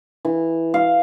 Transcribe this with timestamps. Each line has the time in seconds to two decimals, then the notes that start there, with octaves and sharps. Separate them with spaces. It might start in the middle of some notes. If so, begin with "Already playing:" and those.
0.25 E3
0.74 F5